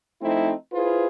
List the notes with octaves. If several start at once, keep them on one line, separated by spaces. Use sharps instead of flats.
F3 A3 C4 D#4 E4
E4 F4 G#4 B4 C5